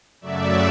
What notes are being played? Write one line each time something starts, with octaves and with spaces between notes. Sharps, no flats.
F#2 C#3 F#3 A3 D5 E5